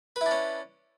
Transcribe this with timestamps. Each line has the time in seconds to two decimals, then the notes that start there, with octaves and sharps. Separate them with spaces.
0.16 B4
0.21 E4
0.26 D4
0.31 C#4